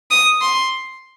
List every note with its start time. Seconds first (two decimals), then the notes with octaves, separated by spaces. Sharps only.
0.11 D#6
0.41 C6